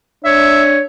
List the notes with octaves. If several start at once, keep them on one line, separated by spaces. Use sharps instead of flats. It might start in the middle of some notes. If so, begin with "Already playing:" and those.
D4 C#5 E5